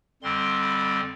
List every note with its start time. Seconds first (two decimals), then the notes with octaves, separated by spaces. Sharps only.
0.22 F2 D3 G3 C4 C6
0.61 B5